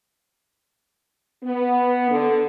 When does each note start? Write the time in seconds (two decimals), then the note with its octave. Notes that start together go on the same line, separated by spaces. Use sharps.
1.44 B3
2.10 D3